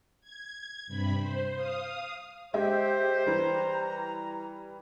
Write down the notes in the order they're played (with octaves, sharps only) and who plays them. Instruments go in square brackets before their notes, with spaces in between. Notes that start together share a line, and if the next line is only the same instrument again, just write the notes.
[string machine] G#6
G2 C3 B5
C5
F5 D#6
[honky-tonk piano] G#3 E5 [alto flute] G4 [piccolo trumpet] C5
[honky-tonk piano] E3 G3 [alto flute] A#5